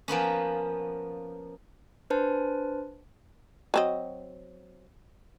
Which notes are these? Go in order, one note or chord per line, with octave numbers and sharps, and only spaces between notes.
F3 A#3 B3 C#4
D4 B4 C5 A5
F#3 C4 D#5